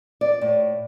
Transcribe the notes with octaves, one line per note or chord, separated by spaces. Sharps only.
D5
A2